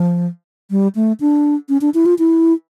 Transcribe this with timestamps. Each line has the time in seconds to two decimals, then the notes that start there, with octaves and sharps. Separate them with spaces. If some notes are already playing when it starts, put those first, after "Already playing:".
Already playing: F3
0.71 G3
0.95 A3
1.20 D4
1.69 C#4
1.81 D4
1.94 E4
2.06 F4
2.19 E4